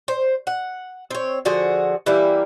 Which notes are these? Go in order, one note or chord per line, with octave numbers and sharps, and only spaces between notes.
C5
F#5
C4 C#5
D3 F3 F#4 G#4
E3 G3 A#3 E4